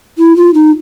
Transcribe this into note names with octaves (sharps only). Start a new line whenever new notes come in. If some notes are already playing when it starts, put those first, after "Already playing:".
E4
F4
D#4